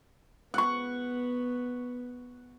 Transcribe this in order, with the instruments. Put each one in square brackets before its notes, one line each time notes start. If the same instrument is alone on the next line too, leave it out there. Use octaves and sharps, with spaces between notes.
[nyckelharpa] B3 [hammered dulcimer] F#5 C#6